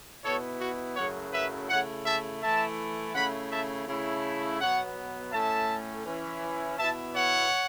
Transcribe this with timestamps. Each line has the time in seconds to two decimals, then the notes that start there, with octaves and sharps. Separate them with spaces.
0.24 B2 B3 E4 A4 C#5
0.61 F#4
0.96 F#2 C#3 F#3 A3 E4 C#5 F#5
1.33 B4 E5
1.69 C#3 A3 E4 C#5 F#5
2.06 E5 A5
2.42 E3 A3 E4 E5 A5
3.15 C#3 A3 E4 F#5 B5
3.51 E5 A5
3.88 C#3 A3 E4
4.60 B2 F#3 B3 C#5 F#5
5.33 A2 A3 C#4 E5 A5
6.06 E3 C#4 E4
6.78 B2 B3 E4 E5 A5
7.14 C#5 F#5